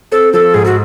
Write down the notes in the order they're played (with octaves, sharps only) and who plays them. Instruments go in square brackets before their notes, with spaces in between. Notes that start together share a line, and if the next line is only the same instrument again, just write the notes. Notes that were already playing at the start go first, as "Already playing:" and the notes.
[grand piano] C4 [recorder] A4
[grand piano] F3 [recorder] A4
[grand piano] G#2 [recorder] G#4
[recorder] F#4